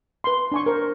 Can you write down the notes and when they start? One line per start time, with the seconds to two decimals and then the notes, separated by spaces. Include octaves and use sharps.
0.24 B4 C6
0.52 D4 G#5 C#6
0.66 A#4 C5